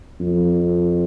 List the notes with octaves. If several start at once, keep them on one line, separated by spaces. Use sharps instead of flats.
F2